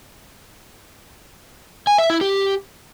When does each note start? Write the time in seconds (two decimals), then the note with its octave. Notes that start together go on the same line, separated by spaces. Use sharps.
1.87 G#5
1.98 E5
2.10 E4
2.21 G4